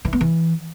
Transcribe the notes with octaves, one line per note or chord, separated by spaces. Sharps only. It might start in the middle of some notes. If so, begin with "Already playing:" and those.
E3
B3
E3